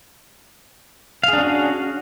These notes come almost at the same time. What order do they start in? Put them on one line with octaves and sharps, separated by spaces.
F5 G#4 D4 C#4 F#4